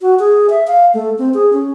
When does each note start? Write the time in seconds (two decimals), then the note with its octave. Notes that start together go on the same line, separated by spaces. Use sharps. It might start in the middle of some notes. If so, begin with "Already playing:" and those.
0.02 F#4
0.19 G#4
0.50 E5
0.67 F5
0.94 A3
1.19 C4
1.34 G#4
1.53 C#4